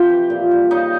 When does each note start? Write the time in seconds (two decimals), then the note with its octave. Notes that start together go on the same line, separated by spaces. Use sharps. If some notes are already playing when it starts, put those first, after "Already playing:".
Already playing: C3 F3 G4 G5
0.10 E3
0.30 A#2
0.51 G3
0.71 C#3 D#4 D#5